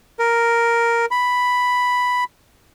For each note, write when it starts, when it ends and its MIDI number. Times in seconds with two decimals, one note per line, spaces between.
0.19 1.06 70
1.11 2.24 83